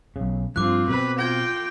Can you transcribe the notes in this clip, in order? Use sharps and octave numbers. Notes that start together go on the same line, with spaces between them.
B1 C#3
G2 F3 C4 F4 D6 F#6
B2 G3 C4 B4
F4 G5 G#6 A#6